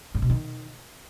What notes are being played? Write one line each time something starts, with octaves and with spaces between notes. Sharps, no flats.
G#2
B2
D#3